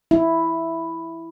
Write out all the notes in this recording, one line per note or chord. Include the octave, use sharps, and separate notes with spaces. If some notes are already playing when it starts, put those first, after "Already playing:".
E4